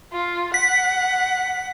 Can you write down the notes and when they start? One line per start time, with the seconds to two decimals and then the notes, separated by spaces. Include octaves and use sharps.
0.13 F4
0.54 F#5 B6